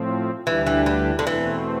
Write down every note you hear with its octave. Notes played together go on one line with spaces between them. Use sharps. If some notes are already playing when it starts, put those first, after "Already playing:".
Already playing: A2 F3 C4
D2 D3 E3 G3 D4 G4
E3
E3
D3
E2 B2 E3 A3 C4